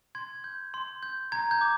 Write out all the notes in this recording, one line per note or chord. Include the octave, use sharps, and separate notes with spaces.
C6 G#6
G6
C6
G6
A#5 G#6
G6
D6